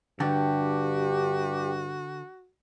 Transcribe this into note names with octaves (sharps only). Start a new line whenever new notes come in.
G2 D3 F#4 G4